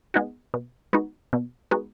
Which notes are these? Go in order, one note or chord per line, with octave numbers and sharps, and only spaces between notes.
G#3 B3 D#4 F#4
B2
G#3 B3 D#4 F#4
B2
G#3 B3 D#4 F#4